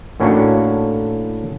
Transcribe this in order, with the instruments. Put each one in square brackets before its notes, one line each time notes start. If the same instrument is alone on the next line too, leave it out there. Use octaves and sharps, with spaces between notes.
[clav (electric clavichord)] A2 A#3 C#4 D4 F#4